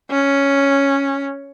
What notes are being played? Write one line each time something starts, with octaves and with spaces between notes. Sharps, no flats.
C#4